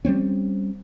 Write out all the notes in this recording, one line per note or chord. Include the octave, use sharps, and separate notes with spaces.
G3 A3 C4 C#4